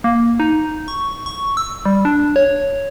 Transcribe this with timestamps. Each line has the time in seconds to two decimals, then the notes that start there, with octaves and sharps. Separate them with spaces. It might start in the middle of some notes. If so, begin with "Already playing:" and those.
0.04 A#3
0.40 D#4
0.88 C#6
1.26 C#6
1.57 E6
1.85 G3
2.05 D4
2.36 C#5